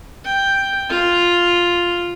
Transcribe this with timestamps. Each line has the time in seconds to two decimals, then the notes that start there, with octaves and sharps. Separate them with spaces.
0.25 G5
0.89 F4